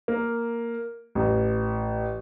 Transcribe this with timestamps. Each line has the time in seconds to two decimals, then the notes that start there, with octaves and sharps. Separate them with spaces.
0.08 A#3
1.15 A1